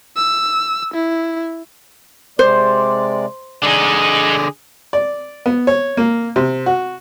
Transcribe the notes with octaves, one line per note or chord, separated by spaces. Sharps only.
E6
E4
C3 G#3 C5 D5
D3 G#3 D#4 G#4 D5
D5
B3
C#5
A#3
C3
F#4